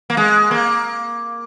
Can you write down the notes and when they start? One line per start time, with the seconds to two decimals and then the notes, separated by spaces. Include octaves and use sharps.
0.10 A#3
0.17 G#3
0.51 A#3